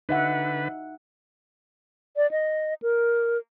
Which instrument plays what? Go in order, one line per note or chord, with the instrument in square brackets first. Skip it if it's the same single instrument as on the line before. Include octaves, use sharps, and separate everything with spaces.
[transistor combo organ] D3 B4 [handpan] D#4 E5 F#5
[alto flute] D5
D#5
A#4